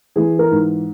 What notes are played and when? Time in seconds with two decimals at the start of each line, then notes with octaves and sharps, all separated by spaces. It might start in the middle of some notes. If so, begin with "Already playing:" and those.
0.16 E3 G#4
0.39 A#4
0.51 G#2